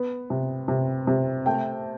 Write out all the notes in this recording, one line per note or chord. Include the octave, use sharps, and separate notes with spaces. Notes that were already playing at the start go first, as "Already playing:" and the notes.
Already playing: B3
C3
C3
C3
A3 G5